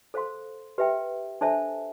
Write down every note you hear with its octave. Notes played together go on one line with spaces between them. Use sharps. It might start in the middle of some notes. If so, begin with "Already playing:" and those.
A4 C5 F5 C6
G4 B4 E5 G5
D4 A4 C5 E5 A5